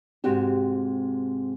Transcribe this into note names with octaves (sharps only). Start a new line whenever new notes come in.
G#2 C3 C4 F#4 G4